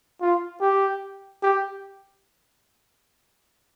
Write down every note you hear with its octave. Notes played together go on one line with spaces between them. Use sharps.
F4
G4
G4